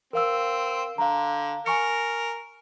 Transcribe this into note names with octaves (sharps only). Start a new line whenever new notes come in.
C4 A#4 F5 E6
D3 F5 A#5
A#4 G#5 C#6 C#7